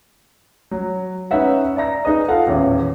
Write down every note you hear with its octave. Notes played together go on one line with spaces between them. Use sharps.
F#3
C#4 D#4 B4 E5 F#5
D5 E5 A#5 A#6
D#4 G#4 B4 D#5
F4 A4 F5 F#5
D#1 A1 E2